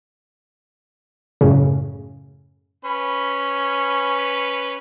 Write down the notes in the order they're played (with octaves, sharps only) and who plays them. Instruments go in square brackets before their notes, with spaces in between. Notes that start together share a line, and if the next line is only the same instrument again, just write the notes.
[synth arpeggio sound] F#2 A2 C#3
[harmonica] C#4 B4